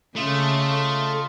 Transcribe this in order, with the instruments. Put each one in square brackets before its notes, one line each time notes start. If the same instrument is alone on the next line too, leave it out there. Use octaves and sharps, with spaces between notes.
[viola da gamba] C#3 [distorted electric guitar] A3 [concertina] F4 D#5